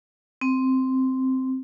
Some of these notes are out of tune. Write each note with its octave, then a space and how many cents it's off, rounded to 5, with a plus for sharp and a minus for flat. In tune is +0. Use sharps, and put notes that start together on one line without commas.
C4 -5